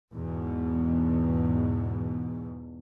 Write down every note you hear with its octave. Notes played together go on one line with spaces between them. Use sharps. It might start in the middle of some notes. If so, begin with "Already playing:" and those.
E2 G#2 B2